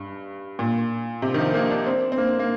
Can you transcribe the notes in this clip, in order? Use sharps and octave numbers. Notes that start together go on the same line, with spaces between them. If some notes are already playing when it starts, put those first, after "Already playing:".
Already playing: G2
A#2
C3
D#3
F3
A#3
D4
C4
C4
A#3
A#3